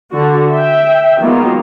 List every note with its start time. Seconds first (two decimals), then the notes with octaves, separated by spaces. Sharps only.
0.12 D3 F#4
0.51 E5 G5
1.22 D#3 F#3 G#3 A#3 B3 F4